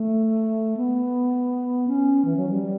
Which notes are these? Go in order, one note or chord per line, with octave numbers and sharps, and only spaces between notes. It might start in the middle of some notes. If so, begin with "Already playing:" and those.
Already playing: A3
B3
C#4
E3
F#3
G3